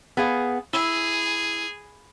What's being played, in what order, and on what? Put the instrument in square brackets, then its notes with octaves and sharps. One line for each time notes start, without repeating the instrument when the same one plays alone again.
[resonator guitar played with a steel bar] B3 G#4 F5
[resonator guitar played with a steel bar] E4 [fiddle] G#4